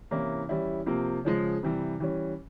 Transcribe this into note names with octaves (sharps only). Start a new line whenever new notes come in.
C3 E3 A#3 C#4 E4
E3 G3 C#4 E4
C3 F3 A#3
C#3 F3 G#3
C3 E3 G3
E3 G3 C#4